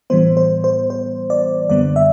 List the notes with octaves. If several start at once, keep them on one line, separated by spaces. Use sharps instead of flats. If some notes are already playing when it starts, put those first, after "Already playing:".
A2 E3 G3 B3 C5
C5
C5
C5
D5
F#2 D3 G3 B3 D5
E5